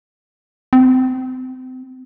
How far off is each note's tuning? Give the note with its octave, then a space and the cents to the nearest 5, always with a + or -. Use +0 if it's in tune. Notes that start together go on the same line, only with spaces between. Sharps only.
C4 -30